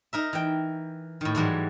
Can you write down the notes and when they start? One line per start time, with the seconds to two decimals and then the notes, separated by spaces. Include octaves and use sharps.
0.13 D#4 A#4 E5
0.33 E3 G5
1.21 A2 D#3
1.35 G#2 E3 F#3 G3